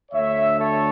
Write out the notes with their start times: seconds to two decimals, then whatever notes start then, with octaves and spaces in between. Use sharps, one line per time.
0.12 D2 D3 A3 C#5 E5
0.58 A4 C#5